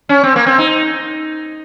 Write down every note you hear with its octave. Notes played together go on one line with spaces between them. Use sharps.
C#4
C4
A#3
C4
D#4